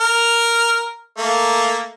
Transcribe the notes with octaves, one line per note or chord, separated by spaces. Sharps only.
A#4 F6
A3 A#3